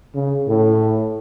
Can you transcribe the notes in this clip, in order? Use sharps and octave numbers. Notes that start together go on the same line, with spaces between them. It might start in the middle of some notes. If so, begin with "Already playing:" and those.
C#3
A2